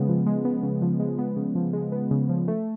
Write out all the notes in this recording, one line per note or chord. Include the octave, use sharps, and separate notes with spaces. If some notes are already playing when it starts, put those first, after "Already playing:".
Already playing: C#3 G#3 B3
F3
G#3
B3
C#3
F3
G#3
B3
C#3
F3
G#3
B3
C#3
F3
A3